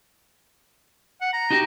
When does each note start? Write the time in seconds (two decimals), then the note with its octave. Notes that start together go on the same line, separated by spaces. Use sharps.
1.21 F#5
1.33 A#5
1.51 D#4 F#4 G4